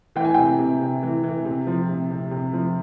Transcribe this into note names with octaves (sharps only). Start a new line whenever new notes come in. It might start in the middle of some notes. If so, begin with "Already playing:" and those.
E3 G5
G#5
C3 G5
C3
C3
E3
E3
C3
F3
C3
C3
C3
F3